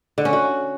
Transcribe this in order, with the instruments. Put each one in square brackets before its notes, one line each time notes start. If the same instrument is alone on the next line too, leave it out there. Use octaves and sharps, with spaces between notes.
[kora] D3
C#4
F#4